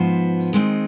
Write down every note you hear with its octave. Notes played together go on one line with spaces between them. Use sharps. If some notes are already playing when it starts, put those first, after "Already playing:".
Already playing: G#2 F3 B3 C5
D#3 G#3 C4 D#4